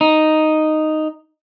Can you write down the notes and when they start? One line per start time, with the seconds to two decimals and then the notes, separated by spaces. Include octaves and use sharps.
0.01 D#4